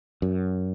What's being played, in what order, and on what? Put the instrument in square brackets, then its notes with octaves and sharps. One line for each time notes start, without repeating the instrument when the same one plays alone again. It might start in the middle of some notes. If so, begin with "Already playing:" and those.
[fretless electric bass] F#2